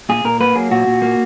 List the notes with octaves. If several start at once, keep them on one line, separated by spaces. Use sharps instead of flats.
A#2 G#4
A#2 A#4
A#3 B4
F#3 G#4
A#2 F#4
A#2
A#3